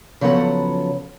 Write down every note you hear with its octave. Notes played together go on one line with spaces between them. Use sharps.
C#3 F3 F#3 B3 A4 F#5